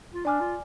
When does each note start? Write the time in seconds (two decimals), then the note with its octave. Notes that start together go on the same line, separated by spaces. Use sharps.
0.14 F4
0.25 D4 D5 G#5 D6 F6
0.41 F4